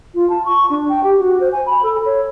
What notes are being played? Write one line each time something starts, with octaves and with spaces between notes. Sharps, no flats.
F4
A5
C#6
D4
G5
G4
F#4
C5
G#5
B5
A4
C#5